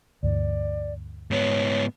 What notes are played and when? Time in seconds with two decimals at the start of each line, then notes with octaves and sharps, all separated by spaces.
0.23 D2 G2 E3 D5
1.31 G#2 B3 C#5